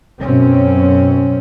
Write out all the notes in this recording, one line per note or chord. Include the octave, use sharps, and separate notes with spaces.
F#2 B2 C4 C#4